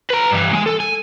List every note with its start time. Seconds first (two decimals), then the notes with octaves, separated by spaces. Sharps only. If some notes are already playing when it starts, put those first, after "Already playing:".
0.10 B4 A#5
0.31 G2 E3
0.53 G#3 G#5
0.66 A4
0.80 G#5